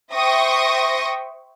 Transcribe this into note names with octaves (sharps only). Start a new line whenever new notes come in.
C5 E5 G5 C#6 D#6 A#6